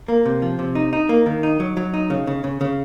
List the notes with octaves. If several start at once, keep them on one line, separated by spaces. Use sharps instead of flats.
A#3
C3
F3
C3
D#4
D#4
A#3
D#3
D#4
F#3
F#3
D#4
C#3
C#3
C#3
C#3